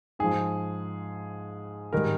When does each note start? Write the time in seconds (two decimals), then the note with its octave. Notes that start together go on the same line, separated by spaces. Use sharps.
0.19 G#2 F3 G#4
1.93 G#2 D#3 G3 A#4